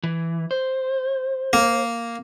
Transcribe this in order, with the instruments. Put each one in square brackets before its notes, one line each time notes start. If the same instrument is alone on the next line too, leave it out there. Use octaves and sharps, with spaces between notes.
[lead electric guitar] E3
C5
[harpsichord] A#3